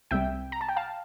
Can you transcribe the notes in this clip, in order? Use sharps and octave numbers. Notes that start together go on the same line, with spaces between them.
C2 C3 G3 E5 G5
A#5
A5
G5
F5 A5